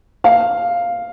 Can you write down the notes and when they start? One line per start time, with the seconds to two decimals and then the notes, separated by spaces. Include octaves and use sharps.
0.24 F5